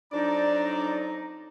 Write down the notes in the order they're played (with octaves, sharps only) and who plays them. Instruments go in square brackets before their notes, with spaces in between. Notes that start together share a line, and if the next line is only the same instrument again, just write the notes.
[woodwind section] F2 F#3 D#4 [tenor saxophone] D4 [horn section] D5 [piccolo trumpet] A#5